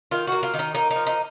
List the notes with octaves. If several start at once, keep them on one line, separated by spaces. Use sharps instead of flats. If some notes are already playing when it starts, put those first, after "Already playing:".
D#3 F4
A#3 F#4
F4
D#3
D#4
A#3 D#4
D#4
F3
D#4